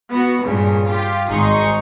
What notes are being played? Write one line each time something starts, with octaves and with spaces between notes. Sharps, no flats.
B3 F#4
G2 A#2 C#3
F4 G4
G#1 G#2 D#4 G#4 C6 C#6